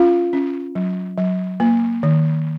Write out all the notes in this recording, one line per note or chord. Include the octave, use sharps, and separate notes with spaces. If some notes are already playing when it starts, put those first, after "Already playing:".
Already playing: C#4 F4 F5
C#4
F#3
F#3
A#3
D#3